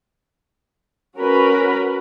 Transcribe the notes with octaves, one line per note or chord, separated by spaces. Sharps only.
C#4 F#4 A#4 B4 B5